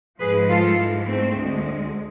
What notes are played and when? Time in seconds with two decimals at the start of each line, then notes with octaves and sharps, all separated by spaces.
0.20 G#2 F3 G#3 G#4 B4
0.49 F4 A4
0.77 G#2 E3 G#3
1.05 A3 C4
1.33 D2 D3 G#3